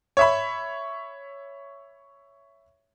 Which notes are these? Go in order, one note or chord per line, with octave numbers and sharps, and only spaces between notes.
C#5 E5 B5